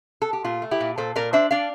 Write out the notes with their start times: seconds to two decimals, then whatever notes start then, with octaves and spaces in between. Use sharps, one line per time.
0.22 A4
0.33 G4
0.44 A#2 F4
0.62 A3
0.71 E4 G4
0.80 A#2
0.98 A#2 A4 C5
1.16 A#2 A#4 D5
1.33 D4 C5 E5
1.51 D4 D5 F5